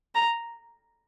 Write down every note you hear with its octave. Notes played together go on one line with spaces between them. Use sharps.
A#5